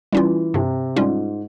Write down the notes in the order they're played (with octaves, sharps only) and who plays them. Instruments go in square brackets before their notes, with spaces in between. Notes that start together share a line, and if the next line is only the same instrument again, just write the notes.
[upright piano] E3 [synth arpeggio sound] G3 C#4 F4
[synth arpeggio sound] G2 [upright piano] C3
[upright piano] G#2 [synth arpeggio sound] G3 C#4 F4